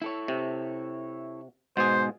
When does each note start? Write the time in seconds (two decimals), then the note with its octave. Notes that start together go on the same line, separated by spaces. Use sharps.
0.02 E4 A4 C#5
0.28 C3
1.77 G#2 B2 G#4 C5